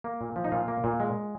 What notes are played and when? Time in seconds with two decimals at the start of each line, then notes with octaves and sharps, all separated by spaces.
0.04 A#3
0.21 A#2
0.36 F3
0.44 D#4
0.52 A#2 F4
0.68 A#3
0.84 A#2
1.00 G#3